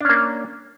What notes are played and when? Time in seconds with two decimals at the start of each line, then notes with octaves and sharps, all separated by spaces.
0.01 D4
0.05 C#4
0.09 A#3